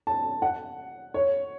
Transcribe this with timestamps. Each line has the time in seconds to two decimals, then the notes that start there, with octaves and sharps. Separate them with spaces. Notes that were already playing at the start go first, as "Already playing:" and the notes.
0.07 A5
0.42 F#5
1.14 C#5